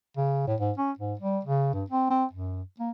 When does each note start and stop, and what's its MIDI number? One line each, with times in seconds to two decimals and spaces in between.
0.17 0.46 49
0.47 0.55 45
0.60 0.72 44
0.78 0.91 61
0.98 1.14 44
1.19 1.39 55
1.44 1.71 49
1.74 1.84 43
1.90 2.08 60
2.10 2.25 60
2.33 2.62 42
2.79 2.90 58